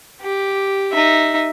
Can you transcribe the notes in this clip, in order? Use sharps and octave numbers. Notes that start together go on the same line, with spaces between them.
G4
D#4 E5